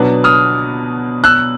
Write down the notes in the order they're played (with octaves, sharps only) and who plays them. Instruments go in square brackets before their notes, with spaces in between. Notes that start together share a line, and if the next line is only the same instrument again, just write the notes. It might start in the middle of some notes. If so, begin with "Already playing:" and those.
Already playing: [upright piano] B2 F#3 B3 D4
[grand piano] D#6 F6
E6 F#6